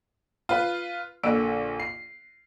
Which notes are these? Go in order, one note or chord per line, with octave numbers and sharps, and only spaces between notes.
F4 B4
A#1 A#2 D3 E6 D7
C7